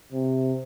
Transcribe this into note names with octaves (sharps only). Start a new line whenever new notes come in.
C3